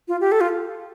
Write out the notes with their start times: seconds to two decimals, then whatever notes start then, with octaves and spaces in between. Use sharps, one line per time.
0.08 F4
0.21 G4
0.32 A4
0.41 F4